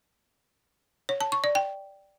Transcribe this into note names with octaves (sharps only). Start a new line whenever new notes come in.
C#5
A5
C#6
D5
G5